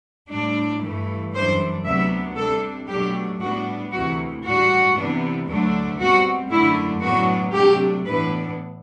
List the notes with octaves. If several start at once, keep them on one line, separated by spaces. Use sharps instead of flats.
A2 G3 D4
G2 E3 A3
F#2 E3 G3 D4 C5
D2 C3 F#3 B3 D4 E5
C3 G3 D4 A4
B2 F#3 A3 D4 G4
A2 G3 B3 D4 F#4
D2 C3 E3 F#4
A2 G3 D4 F#4
C3 E3 B3 D4
D2 D3 F#3 A3 D4
B2 G3 C4 F#4
F#2 D3 A3 D4 E4
A2 F#3 B3 D4 F#4
C3 F#3 A3 D4 G4
A2 E3 B3 D4 B4